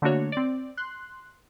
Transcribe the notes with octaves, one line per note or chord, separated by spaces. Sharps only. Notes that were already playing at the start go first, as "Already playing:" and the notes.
D3 A3 A#3 D4 F#4 C#5
C4 D5
C6 F#6